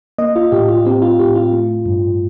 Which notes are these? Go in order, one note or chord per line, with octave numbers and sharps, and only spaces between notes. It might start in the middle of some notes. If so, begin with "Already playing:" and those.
A#3 D#5
F4
A2 G4
F4
C4 G4
F4
A2 G4
F4
A3
G2